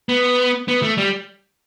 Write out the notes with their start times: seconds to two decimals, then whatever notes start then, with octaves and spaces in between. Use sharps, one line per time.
0.09 B3
0.68 B3
0.82 A3
0.97 G3